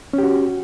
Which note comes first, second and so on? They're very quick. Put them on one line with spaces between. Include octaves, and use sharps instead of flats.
C#4 G4 F#4